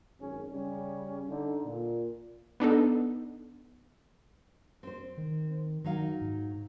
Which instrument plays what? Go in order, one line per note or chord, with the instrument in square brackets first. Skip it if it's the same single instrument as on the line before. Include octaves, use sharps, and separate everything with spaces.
[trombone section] G#1 F#2 C#4 G#4
C#3 G3 C#4
D3 D#4
A#2
[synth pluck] B3 D4 D#4 A4
[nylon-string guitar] C4 C5
[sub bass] D#3
[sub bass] D#3 [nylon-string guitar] F#3 D#4 F5
[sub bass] G#2